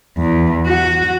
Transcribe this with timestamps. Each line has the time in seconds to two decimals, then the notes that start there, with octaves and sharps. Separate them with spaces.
0.18 E2
0.67 F#4